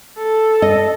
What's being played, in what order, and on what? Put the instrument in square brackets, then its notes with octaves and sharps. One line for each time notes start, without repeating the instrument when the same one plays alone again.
[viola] A4
[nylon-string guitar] D#5